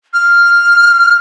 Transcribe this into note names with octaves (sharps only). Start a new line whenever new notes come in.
F6